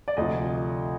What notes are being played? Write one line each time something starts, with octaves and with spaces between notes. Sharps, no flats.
D5
D2 C3 F3 D#5